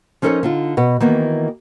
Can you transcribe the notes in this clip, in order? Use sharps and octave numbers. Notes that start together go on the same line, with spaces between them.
F3 C#4 D#4 A4 A#4 C#5
D3 D#4 F4
B2 B4 F#5
D#3 E3 A#3 B3 F#4